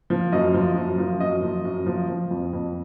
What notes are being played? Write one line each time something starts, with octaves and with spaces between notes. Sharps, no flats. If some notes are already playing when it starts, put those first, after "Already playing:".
F3
F#2 D#5
F3
F#2
F3
F#2 D#5
F3
F#2
F3
F3
F2
F2